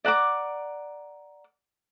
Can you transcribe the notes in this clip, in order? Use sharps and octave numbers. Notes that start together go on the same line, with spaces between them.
D5 F#5 A#5 D6